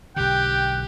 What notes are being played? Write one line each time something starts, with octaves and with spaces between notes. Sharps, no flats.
B1 D3 G4 G5 F#6